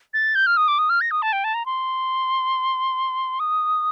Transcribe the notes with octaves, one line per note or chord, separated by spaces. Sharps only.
A6
G6
F6
D#6
D6
D#6
F6
A#6
D#6
A5
G5
A5
A#5
C6
D#6